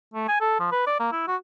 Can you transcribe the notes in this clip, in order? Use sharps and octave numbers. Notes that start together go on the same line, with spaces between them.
A3
G#5
A4
F3
B4
D5
A#3
E4
F#4